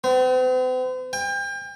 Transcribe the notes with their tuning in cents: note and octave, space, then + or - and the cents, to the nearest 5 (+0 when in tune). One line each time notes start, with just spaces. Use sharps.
C4 -45
G5 +35